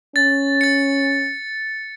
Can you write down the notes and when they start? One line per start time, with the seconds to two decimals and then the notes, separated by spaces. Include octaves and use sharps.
0.16 C#4 A6
0.61 A6 C#7